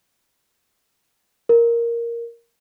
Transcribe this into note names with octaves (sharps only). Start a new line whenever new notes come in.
A#4